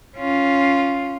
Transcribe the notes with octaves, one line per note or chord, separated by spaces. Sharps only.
C#4 F4